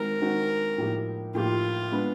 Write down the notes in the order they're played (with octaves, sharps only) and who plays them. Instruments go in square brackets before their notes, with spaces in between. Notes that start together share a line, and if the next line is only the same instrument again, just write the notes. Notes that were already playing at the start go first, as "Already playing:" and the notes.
Already playing: [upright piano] D#3 G#3 C4 D#4 F#4 [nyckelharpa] A#4
[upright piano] D#3 G#3 C4 D#4 F#4
A2 F3 A#3 D#4 G4
[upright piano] A2 F3 A#3 D#4 G4 [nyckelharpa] F4
[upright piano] G#3 B3 D4